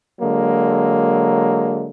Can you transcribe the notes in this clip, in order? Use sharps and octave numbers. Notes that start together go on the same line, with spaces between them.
D3 F#3 G#3 A#3